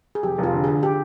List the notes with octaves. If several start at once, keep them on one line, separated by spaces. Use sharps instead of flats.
G#4
F1 G4
F1
F4
D3
D3 G#4
D3 G4